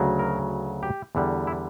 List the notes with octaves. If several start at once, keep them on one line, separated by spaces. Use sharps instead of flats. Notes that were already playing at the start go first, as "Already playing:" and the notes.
Already playing: D2 C#3 F#3
A#4
G4
E2 D3 G3
E4